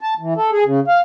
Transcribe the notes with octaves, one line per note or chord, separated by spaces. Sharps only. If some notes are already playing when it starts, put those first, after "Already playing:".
A5
E3
A4
G#4
C#3
F5